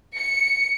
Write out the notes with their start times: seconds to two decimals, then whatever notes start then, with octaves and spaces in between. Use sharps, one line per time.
0.17 C#7